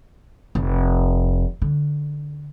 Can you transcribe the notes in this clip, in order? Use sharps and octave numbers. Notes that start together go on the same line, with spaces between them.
F1
D3